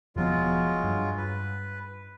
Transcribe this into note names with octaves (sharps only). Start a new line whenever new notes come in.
E1 F3 F#3 G#3 B3 F4
G2
B4